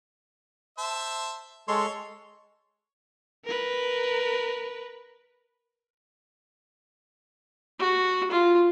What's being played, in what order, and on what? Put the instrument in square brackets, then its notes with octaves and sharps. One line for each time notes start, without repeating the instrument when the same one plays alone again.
[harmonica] C5 E5 A5
[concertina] G#3 A4 C6 [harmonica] C#5
[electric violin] A#4 B4
[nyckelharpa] F#4
F4